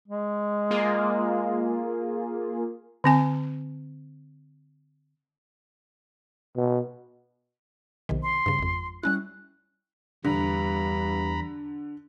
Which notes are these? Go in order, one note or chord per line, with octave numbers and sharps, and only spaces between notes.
G#3
A#3 F4 G#4
D3 C4 G#5
B2
B1 C3 D#3
C6
G2 C#3
G#1 F2
G3 C#4 E4 F#6
E2 G2 D3 A#5 B5